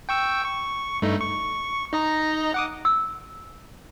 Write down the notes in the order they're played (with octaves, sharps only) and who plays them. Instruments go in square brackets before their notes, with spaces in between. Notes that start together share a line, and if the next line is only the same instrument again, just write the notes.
[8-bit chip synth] G5 C#6 E6
C#6
G2 A3 D#4
C#6
D#4 D#5 A#5
F#5 D6 D#6
[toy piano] E6